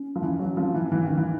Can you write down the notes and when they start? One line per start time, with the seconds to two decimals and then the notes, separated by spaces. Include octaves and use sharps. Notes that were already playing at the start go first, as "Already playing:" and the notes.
Already playing: C#4
0.16 F3
0.22 E3
0.39 F#3
0.57 F3 C4
0.74 E3
0.83 C#4
0.92 E3
1.04 D#3 D#4
1.18 E3